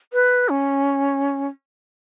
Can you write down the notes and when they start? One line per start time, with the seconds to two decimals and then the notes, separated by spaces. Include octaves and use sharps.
0.13 B4
0.49 C#4